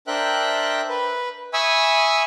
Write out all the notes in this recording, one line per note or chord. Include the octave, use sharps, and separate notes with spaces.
D4 A#4 C5 E5 G5 F#6
B4
E5 G#5 B5 C#6 D#6 E6